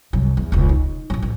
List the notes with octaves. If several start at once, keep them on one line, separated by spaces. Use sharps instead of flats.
C2 F#2
E2
E1 C#2
D#4
A1 F#3
A1